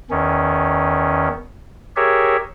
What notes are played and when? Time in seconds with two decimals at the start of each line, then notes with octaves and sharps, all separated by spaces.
0.11 E2 D#3 C#4
1.96 G4 G#4 A#4 C#5 E5